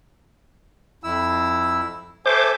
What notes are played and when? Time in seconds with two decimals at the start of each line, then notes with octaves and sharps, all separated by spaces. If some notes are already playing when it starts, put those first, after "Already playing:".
1.04 F2 E4 E6
2.26 A4 C5 E5 G#5 D6